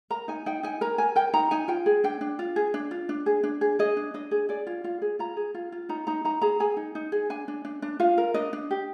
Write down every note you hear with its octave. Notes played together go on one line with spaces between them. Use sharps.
A#4 A#5
D#4 G#5
D#4 G5
D#4 G#5
A#4 A#5
A#4 G#5
A#4 G5
D#4 A#5
D#4 G#5
F4 G5
G#4
D4 G5
D4
F4
G#4
D4
F4
D4
G#4
D4
G#4
G#4 D#5
D4
D4 D#5
G#4
G#4 D5
F4
F4
G#4
F4 A#5
G#4
F4
F4
D#4 A#5
D#4 A#5
D#4 A#5
G#4 A#5
G#4 G#5
D#4
D#4
G#4
D4 G#5
D4
D4
D4
F4 F5
A#4
D4 D#5
D4
G4